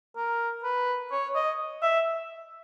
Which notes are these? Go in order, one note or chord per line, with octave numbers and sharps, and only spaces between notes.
A#4
B4
C#5
D#5
E5